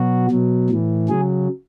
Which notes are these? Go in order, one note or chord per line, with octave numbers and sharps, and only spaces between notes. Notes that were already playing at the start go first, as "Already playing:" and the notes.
Already playing: B2 F#3 F#4
B2 F#3
A2 E3
C#3 F#3 G#4